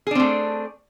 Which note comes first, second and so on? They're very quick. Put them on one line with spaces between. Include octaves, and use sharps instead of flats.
G#4 D4 C4 A3